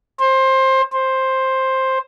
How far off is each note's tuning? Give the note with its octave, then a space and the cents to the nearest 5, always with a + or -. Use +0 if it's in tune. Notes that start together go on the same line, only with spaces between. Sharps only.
C5 +20
C5 +10